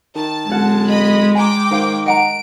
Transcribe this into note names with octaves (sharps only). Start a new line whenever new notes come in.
D#3 A5
D1 G#3 C#4 F#5
D#5 B5
G5 G#5 A#5 D6
D#3 A#4 C5 F5
D#5 F#5 A#5 D7